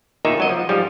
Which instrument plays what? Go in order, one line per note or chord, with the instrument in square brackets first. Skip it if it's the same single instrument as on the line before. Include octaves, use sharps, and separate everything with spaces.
[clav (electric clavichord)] E2 A#2 D#3 D#4 E5
C#2 F#3 D#5
F3
G#2 F3 G3